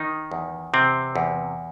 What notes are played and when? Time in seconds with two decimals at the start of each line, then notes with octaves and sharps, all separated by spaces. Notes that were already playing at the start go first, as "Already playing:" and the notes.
Already playing: D#3 D#4
0.32 E2
0.74 C3 C4
1.16 E2